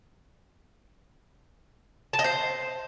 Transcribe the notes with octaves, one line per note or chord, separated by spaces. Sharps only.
A5
D#5
C5